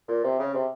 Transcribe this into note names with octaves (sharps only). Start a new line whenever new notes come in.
A#2
C3
C#3
C3